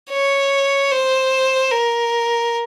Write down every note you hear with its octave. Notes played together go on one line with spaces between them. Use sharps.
C#5
C5
A#4